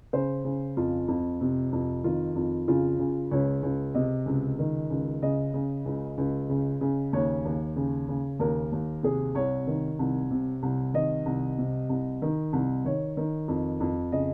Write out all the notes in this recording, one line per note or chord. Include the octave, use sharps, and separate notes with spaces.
C#3 C5
C#3
F2 F4
F2
C3
F2
D#3 F4
F2
C#3 F4
C#3
C#2 C#5
C#2
C3 D#5
C#2
D#3
C#2
C#3 D#5
C#3
C#2
C#2
C#3
C#3
D#2 C#5
D#2
C#3
C#3
D#2 A#4
D#2
C3 G#4
C2 C#5
D#3
C2
C3
C2
D#3 D#5
C2
C3
C2
D#3
C2
D#3 C#5
D#3
F2
F2
C#3 D#5